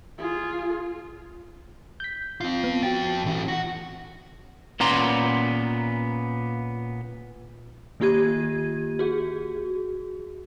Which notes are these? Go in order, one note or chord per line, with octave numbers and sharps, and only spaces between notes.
F4 G#4
G6 B6
C4 F4
B3
F2 F#4 G5 A6
E3 C#4
F#4 F#5
A#2 B3 C#4 D5 A#5 C6
D#3 A#3 F4 G4 G#6 D#7
F#4 G#4